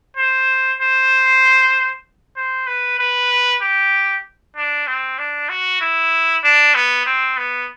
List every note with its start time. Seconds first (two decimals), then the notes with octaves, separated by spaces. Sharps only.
0.17 C5
0.80 C5
2.37 C5
2.67 B4
2.99 B4
3.62 G4
4.56 D4
4.87 C4
5.19 D4
5.49 F#4
5.81 E4
6.44 D4
6.75 B3
7.06 C4
7.37 B3